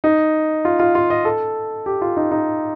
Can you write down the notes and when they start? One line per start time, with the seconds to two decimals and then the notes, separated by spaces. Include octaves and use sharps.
0.04 D#4
0.65 F4
0.80 F4
0.95 F4
1.10 D#5
1.25 A4
1.86 G4
2.02 F4
2.17 D#4
2.31 D#4